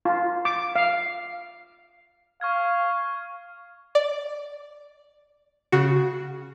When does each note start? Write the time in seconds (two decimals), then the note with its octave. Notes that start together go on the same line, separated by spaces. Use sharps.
0.05 F4
0.45 D6
0.76 F5
2.41 F5 C#6 F6 G#6
3.95 D5
5.72 C#3 F#4